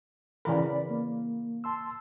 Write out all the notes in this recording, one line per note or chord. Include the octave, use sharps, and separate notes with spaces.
C#3 E3 A#4 D5 B5
A#3
A5 C6 E6